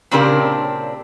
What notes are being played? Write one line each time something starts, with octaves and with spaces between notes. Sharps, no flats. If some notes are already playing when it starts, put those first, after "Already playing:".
A#2 C#3 C4 D4 G4 A#4